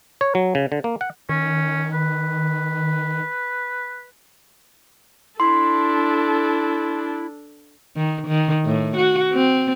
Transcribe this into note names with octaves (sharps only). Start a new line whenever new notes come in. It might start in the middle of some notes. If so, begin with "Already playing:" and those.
C#5
F#3
C#3
D3
A#3
F#5
D#3 C#4
B4
D4 E4 A4 C6
D#3
D#3
A2
F#4
C4